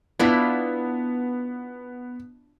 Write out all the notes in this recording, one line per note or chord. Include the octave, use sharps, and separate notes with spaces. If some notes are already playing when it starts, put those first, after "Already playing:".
B3 D4 E4 F4 B6